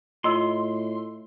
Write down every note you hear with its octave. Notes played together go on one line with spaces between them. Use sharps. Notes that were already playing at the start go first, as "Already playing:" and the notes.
A2 F4 D#5 C6 E6